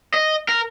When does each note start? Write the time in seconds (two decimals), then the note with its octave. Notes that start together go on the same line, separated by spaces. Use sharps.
0.14 D#5
0.49 A#4